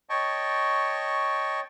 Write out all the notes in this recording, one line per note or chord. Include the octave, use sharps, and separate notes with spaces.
C#5 D#5 G5 A5 C#6